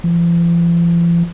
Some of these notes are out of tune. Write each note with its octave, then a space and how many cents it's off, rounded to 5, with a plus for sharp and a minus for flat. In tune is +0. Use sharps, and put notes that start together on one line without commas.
F3 -45